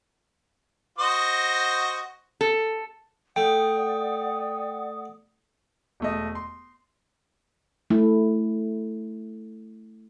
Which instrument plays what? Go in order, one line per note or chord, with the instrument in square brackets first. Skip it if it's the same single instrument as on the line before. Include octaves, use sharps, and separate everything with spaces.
[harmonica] F#4 C5 D#5
[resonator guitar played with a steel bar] A4
[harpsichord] A3 [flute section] D5 F#5 D#6 [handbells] G5
[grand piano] E1 A3 D#5
C6
[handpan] A3 E4